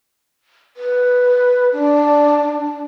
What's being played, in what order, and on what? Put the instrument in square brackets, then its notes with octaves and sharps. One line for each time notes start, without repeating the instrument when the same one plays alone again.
[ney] B4
D4